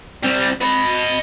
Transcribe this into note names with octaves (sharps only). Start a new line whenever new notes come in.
G3 C4
D#5 B5